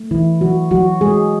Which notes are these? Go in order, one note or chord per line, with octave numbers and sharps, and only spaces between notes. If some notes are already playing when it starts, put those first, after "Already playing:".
Already playing: A3
E3 E4
F#3 F#4
F#3 F#4
G#3 G#4